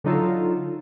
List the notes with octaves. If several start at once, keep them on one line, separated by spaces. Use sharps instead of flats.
D3 F#3 D#4 F4 A4